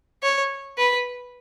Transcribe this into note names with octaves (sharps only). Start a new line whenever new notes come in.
C#5
B4